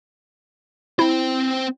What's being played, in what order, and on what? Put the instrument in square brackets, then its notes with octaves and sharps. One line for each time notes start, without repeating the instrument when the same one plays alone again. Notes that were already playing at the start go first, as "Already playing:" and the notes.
[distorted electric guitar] C4 C5 [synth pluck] E4